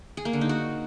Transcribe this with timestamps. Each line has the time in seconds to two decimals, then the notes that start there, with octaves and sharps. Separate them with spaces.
0.17 G#4
0.25 A#3
0.33 D3
0.41 D#4
0.49 F#4